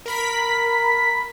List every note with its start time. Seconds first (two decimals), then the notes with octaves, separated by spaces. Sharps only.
0.06 A#4 B5 B6